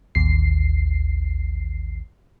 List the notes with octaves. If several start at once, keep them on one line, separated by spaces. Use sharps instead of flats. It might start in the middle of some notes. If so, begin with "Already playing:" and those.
A1 D#2 C7